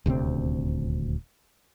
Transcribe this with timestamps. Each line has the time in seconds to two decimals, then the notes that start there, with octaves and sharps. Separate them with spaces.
0.06 D#1 D2 C3 C4